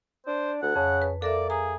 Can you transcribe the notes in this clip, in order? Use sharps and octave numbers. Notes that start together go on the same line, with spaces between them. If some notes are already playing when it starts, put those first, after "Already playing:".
D4 C5
D2 F#5
F2 C#3
B4
A#3 A4 A#4 D5 E5
G#4 A#5